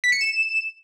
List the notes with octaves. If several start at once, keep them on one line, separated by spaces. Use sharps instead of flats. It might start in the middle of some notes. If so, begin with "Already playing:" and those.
B6
C#7
E7